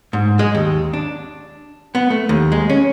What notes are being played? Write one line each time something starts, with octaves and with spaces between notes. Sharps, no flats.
G#2
G#3
D#2
D4
B3
A3
D#2
G#3
C#4